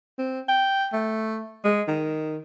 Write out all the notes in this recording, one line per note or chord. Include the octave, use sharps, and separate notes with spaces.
C4
G5
A3
G#3
D#3